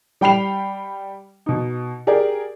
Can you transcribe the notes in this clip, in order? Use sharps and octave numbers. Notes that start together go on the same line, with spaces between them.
G3 G5 B5 C7 F7
B2 D#4
G4 G#4 A#4 D5